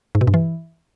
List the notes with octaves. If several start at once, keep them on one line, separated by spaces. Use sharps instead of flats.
G#2
B2
G2
E3